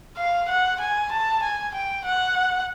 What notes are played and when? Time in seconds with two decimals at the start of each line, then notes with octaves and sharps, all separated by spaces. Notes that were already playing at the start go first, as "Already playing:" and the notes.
0.17 F5
0.48 F#5
0.80 G#5
1.11 A5
1.43 G#5
1.74 G5
2.05 F#5